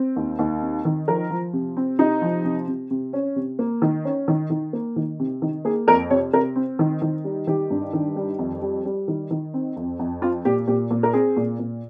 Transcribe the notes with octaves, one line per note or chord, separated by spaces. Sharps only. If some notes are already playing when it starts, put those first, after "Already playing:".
Already playing: C4
D#2
D#2
C4
D#3
F3 A#4
F3
C3
C4
C3 D#4
F3
C3
C3
C3
C#4
C3
A#3
D#3
C#4
D#3
D#3
A#3
D#3
C3
D#3
A#3 G#4
F2 A#4
C3 C#5
C3 A#4
C4
D#3
D#3
G3
D#3 G4
G2
D#3
G3
F2
G3
G3
D#3
D#3
C4
F2
F2
C4 F4
A#2 G4
A#2 G4
A#2
A#4
C4 G#4
A#2
A#2